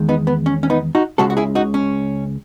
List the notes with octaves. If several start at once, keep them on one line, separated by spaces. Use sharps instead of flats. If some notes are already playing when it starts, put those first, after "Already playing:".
Already playing: E2 D#3 G#3
B3 D#4
B3
C#4
C#4
B3 D#4
D#4 F#4
C#2 C#3 G#3 F#4 A4
F#4
E4 G#4
D#4 F#4
C#4